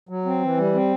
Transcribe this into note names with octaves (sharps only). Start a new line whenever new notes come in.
F#3
C4
E3
G3
C4